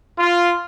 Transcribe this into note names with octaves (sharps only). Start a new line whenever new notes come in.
F4